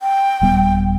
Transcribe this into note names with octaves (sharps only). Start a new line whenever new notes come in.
G5
D#1 G3 B3